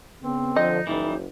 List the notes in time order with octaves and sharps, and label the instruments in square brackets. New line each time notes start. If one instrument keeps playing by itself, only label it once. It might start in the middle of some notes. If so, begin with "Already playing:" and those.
[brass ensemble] C#3 B3 [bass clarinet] C4
[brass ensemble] D3 F3 [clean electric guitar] D#4 [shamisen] D#5
[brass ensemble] F#1 [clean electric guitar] E3 G3 [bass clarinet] D#4